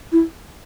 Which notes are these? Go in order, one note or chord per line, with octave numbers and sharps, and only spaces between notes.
E4